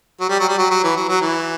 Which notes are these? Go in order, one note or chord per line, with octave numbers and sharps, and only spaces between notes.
F#3
G3
F#3
G3
F#3
F#3
E3
F#3
F#3
E3